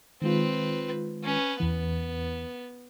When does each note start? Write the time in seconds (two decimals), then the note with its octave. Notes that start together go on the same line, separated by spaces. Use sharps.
0.22 D#3 G#3 C4 F4 B4
1.24 C#4 B4
1.60 E2 E3 B3